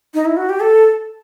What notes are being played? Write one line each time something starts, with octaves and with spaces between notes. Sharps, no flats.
D#4
E4
F#4
G4
A4